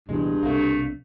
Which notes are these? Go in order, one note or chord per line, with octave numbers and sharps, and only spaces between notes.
C#2 G2 B2 E3 G#3
B1 C3 A3 A#3 D4